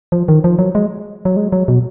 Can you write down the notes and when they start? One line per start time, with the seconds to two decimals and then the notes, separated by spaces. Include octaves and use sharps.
0.12 F3
0.28 D#3
0.44 F3
0.59 F#3
0.75 G#3
1.25 F#3
1.37 G#3
1.52 F#3
1.68 B2